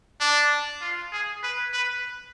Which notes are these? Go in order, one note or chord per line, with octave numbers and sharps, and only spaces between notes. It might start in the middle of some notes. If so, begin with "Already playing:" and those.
D4
F4
G#4
B4
B4